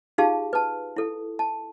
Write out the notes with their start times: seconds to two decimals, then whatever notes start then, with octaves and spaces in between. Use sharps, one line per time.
0.18 D#4 F4 G4 G#4 F5 A5
0.53 B4 A5
0.97 E4 A4
1.39 A5